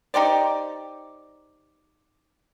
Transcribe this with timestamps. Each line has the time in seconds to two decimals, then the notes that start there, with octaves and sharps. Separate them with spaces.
0.14 D#4 G4 C5 D5